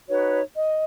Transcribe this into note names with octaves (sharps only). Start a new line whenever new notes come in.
D#4 F#4 B4 C#5
D#5